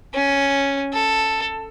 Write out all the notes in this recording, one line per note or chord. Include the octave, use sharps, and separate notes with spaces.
C#4
A4